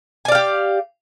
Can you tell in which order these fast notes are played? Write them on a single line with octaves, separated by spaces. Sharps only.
G#5 D5 F5 G4